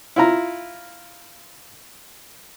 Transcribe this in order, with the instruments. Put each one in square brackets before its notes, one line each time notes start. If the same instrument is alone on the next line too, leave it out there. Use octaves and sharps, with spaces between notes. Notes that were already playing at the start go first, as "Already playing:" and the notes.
[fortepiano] E4 F4 A#5